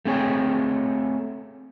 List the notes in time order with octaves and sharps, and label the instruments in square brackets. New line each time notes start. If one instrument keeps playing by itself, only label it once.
[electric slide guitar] A3 C4 G#4 C#5 G5